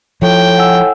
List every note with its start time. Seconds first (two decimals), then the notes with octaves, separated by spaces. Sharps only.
0.22 A2 F3 G5
0.58 F#5 G#5 E6